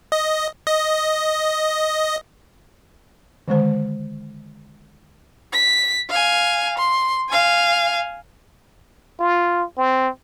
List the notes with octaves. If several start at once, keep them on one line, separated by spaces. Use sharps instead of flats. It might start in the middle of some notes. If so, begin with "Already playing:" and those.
D#5
D#5
D3 D#3 G#3 C5
B6
F5 G#5
C6
F5 G#5
F4
C4